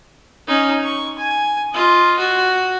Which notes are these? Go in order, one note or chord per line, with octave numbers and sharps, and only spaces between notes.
C#4 D#4
C#6
G#5
F4 D#5
F#4